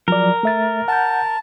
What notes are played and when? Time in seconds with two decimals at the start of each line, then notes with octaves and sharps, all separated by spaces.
0.08 F3 F#3 A#4 D5
0.43 A3 E5 A6
0.88 F#5 A5 G6